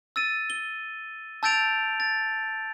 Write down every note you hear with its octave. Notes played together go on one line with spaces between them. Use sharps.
E6 A6 D#7
G7
A5 E6 G6 A6 D7 F7
A6